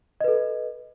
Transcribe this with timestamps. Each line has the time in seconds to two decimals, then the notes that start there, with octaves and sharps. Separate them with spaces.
0.21 D#5
0.24 B4
0.28 A4